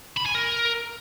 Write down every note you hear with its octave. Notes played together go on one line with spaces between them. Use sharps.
B5
G#5
A#4